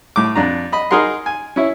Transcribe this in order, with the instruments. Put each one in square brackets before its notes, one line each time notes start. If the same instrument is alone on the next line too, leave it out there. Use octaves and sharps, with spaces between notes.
[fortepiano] A2 D6
F2 D4 A#5
D#5 B5
D#4 G#4 A#4 F#5 C6
G#5
C#4 E4